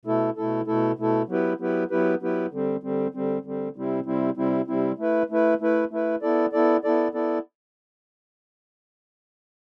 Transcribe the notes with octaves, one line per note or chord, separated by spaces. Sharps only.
B2 A3 E4 A4
B2 A3 E4 A4
B2 A3 E4 A4
B2 A3 E4 A4
F#3 B3 E4 G4 B4
F#3 B3 E4 G4 B4
F#3 B3 E4 G4 B4
F#3 B3 E4 G4 B4
D3 G3 C4
D3 G3 C4
D3 G3 C4
D3 G3 C4
C3 G3 C4 E4
C3 G3 C4 E4
C3 G3 C4 E4
C3 G3 C4 E4
A3 E4 B4
A3 E4 B4
A3 E4 B4
A3 E4 B4
B3 E4 A4 D5
B3 E4 A4 D5
B3 E4 A4 D5
B3 E4 A4 D5